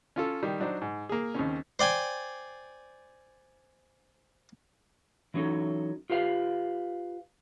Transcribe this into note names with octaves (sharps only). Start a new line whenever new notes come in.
C#4 F4 A4
D#3 G3
F#3 D4 D#4 C5
G#2
A#3 G#4
D#2 C#3 C4 C#4
C5 D5 G5 G#5
E3 F#3 C#4 D#4 A4
F4 G4 B4 F5